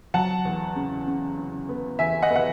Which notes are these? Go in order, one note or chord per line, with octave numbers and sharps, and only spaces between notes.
F#3 F#5 A5
E2
C#3
C#3
C#3
B3
E2 E5 G#5
D#5 F#5
B3
F#5